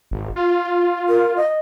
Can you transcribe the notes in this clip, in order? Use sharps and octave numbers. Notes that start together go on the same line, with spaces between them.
G#1
F4
A#4
D#5